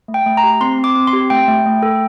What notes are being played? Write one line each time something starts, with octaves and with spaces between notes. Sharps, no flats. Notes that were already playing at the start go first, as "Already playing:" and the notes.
A3
G5
A3
A#5
G4
C4 C6
C4
D6
C4
C6
G4
A3 G5
A3
A3
A4